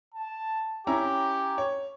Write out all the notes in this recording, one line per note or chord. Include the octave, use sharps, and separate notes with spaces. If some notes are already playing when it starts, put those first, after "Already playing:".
A5
C#4 E4 G4 A#5
C#5